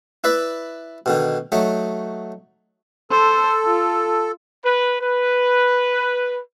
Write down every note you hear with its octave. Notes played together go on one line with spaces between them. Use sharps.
E4 B4 D5 E5
B2 D3 D#3
F#3 A3 D#4
A4 C5
F4
B4
B4